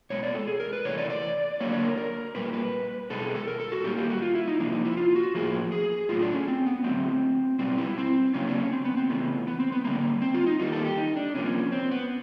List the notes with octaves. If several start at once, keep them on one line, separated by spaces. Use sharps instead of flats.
B2 G#3 B3 C#5
D5
A4
G#4
A#4
B4
C3 E3 A3 C#5
D5
D5
D3 F#3 A#3 C#5
C#5
A#4
A#4
A#2 G3 A#3 B4
B4
B2 G#3 B3 A4
G#4
A4
A#4
A4
F#4
A#2 G3 A#3 G4
G4
F#4
F4
E4
D#4
C3 F3 A#3 D4
D#4
E4
F4
F#4
A2 F3 A#3 G#4
G#4
A2 F#3 A3 F4
D4
C#4
C4
B3
D3 F#3 A3 C4
B2 G3 B3 C4
E4
C4
C#3 F#3 A#3 C#4
D4
C#4
C4
B3
C4
C#3 E3 A3 B3
B3
C4
B3
D3 G3 A#3
C4
F4
D#4
D#3 G3 A#3 D#4
A4
G4
D#4
D4
C3 F3 A#3 C#4
C4
B3